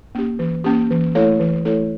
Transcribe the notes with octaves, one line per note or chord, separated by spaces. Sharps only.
A#3 C#4 G4
E3
A#3 C#4 G4
E3
A3 E4 A4 C#5
E3
A3 E4 A4 C#5